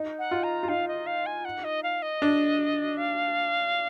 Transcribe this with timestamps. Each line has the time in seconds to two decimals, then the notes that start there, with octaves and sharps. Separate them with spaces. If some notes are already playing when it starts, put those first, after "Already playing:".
Already playing: D#4
0.19 F#5
0.31 F4
0.44 A#5
0.63 F4
0.68 D#4 F5
0.88 D#5
1.07 F5
1.26 G#5
1.45 F#5
1.64 D#5
1.83 F5
2.02 D#5
2.22 D4
2.97 F5